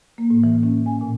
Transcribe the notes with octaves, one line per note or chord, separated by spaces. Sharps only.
A#3
A2
E3
C#4
G#5
A#2